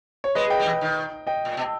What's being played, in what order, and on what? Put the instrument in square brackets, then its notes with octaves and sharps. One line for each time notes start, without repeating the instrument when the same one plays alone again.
[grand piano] C#5
[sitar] G#3 [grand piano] B4 D#5
[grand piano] D#5 G5
[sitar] G3
E3
D#3
[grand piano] D#5 G5
[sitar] A#2
B2